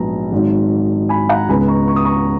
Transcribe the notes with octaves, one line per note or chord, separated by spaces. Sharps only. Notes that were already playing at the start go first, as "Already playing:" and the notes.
Already playing: A#1 G#2 F#3 B3 A#5
G#1 G#2 D#3 F#3
G#5 B5
F#5 A#5
C#2 C#3 G#3 B3 G#5 B5
A#5 C#6
C#6
D#6
A#5 C#6